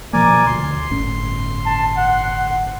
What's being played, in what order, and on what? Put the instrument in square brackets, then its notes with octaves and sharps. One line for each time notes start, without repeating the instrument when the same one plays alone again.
[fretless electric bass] B2 F3 A#3 [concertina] A#4 D5 G#5
[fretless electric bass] D2 [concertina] C6
[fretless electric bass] G1 A2 C#4
[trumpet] A5
F#5